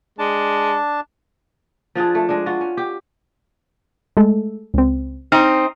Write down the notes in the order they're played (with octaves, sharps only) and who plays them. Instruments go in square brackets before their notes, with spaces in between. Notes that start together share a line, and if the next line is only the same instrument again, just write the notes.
[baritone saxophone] G#3 [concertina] D4 A5
[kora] F3 D4 F4 G#4
A3
G#3 D4
F4 F#4
C#4
G4
[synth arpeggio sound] G#3 A3 A4
C#2 C4
[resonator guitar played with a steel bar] C4 D#4 [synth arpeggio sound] F6